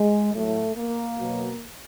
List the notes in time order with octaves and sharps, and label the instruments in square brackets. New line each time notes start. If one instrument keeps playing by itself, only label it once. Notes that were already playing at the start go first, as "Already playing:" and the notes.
Already playing: [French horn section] G#3
A2 F#3 A3
A#3
B2 F#3